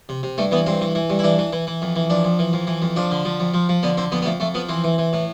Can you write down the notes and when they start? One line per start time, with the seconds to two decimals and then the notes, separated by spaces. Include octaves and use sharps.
0.09 C3
0.23 C3
0.38 G2 A3
0.51 E3 B3
0.66 G2 C4
0.81 E3
0.95 E3
1.10 G2
1.19 E4
1.24 E3 D4
1.39 E3
1.53 E3
1.67 E3
1.82 F2
1.96 E3
2.10 F2 D4
2.24 F2
2.39 E3
2.53 F2
2.67 E3
2.82 F2
2.96 F3 D4
3.11 D3
3.25 F3
3.40 F2
3.54 F3
3.69 F3
3.83 D3 B3
3.97 D3 C4
4.12 F2 B3
4.22 B3
4.26 F2 A3
4.40 F2 A3
4.54 F3 B3
4.69 E3 C4
4.84 E3
4.98 E3
5.13 A2